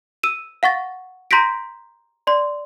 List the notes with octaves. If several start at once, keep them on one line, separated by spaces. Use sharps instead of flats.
E6 D#7 E7
F5 F#5 C#6 A6
A#5 C6 G6 A#6 B6 D7
D5 C6